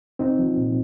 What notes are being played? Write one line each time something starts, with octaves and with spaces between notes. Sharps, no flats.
C2 C4 D#4
F3
A#2